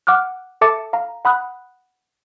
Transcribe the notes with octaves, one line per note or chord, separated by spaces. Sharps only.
F#5 D6 F6 F#6
A4 E5 A5 D6 A6 C#7
F5 A#5
F#5 B5 D#6 F#6